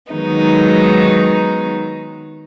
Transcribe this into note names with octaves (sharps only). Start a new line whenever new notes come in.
D#3 F#3 G#3 B3 D#4